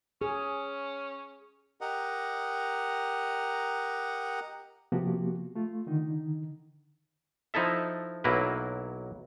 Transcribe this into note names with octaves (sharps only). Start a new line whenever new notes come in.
C#4 G#4
G4 A#4 D#5 F#5
C3 F3 A#3 B3 F#4 G4
A3 F4
D3 D#3 D#4
F3 D#4 E4 A4 E5
B1 F#3 A#3 E4 A#4 B4